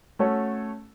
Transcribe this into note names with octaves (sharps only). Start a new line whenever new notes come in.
A3 C#4 F#4 A4 C#5